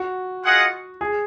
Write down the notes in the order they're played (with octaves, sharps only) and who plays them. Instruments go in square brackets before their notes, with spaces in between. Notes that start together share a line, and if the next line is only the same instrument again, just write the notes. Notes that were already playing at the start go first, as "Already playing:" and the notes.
Already playing: [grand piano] F#4
[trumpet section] F4 G#4 D#5 F#5
[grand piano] G#4